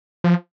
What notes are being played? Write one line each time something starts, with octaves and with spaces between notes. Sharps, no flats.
F3